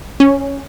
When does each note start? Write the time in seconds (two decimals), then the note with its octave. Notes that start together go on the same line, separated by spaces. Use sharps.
0.20 C#4